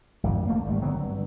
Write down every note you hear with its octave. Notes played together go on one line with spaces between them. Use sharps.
G#1 F2 D3
A3 A#3
G#1 G3
D3 F#3 B3 C4
G2